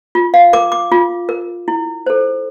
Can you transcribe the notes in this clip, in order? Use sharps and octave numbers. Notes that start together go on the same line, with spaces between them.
F4
F5
A#4 D6
D6
F4
A#4
E4
A4 C5